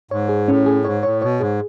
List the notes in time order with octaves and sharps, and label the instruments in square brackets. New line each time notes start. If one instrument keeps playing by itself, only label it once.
[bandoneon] G#2 [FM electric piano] C#5
[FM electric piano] G#4
[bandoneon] A2 [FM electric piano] C#4
[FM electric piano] G#4
[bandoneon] G#2 [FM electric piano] C#5
[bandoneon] A2 [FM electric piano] C#5
[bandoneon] B2 [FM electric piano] C#5
[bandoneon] G#2 [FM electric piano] G#4